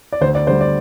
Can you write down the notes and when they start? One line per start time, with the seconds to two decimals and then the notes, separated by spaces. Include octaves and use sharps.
0.13 D5
0.21 D2 C5
0.35 D5
0.47 D3 G3 C5
0.61 D5